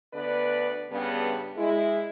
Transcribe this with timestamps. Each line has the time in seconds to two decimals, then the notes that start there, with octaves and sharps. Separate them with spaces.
0.14 D2 D3 B3 B4 D5
0.91 G2 C#3 B3
1.56 G#3 E4